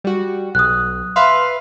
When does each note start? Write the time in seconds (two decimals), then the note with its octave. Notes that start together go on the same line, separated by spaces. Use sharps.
0.04 G3 F#4
0.55 B1 D#6 F#6
1.16 B4 E5 F5 C6